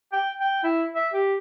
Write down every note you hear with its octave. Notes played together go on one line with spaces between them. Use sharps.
G5
G5
E4
E5
G4